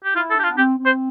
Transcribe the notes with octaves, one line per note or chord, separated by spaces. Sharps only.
G4
E4 F4
A4
D4 G4
F4
B3
C4 G4
C4
C5